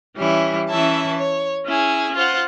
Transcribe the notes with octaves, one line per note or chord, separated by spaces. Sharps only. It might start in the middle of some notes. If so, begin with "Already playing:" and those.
E3 G3 C#4 E4
E3 C#4 E4 E5 A5
C#5
C#4 E4 G#4
F4 C5 F#5